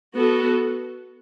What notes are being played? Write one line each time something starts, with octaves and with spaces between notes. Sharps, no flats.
B3 F#4 A4